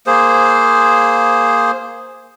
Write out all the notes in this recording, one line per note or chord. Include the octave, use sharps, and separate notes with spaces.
A#3 G#4 C5